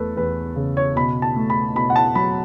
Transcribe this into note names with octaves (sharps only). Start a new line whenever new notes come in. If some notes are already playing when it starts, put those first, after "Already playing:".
Already playing: E2 A3 A4 B4
E2 B4
C#3
C#5
B2 B5
A5
A3
B5
B2 B5
F#5
A5
F#3 B5